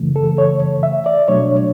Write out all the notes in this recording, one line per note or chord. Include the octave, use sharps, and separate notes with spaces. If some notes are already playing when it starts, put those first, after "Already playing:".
Already playing: F#2 C#3 E3 A3
A4
C#5
E5
D5
B2 F#3 A3 D4 C#5